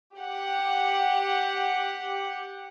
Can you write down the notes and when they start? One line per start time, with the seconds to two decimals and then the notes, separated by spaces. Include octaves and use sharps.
0.17 G4 F#5